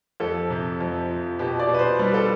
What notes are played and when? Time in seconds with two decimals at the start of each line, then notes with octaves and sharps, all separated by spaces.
0.20 F2 A4
0.50 C3
0.80 F2
1.10 F3
1.39 B2 G4
1.59 D5
1.69 B2
1.74 B4
1.79 C5
1.99 G3 B4
2.09 G4
2.14 A4